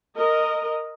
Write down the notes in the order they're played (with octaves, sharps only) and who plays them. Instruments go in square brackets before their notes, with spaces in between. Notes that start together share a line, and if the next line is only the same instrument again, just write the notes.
[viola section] A#4 D#5